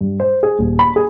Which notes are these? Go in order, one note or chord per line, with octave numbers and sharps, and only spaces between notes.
G2
C5
G#4
D#1
B5
G#4